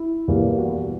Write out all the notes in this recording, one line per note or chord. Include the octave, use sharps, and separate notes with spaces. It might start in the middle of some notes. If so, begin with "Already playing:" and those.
Already playing: E4
E2 B2 G3 A#3
F#4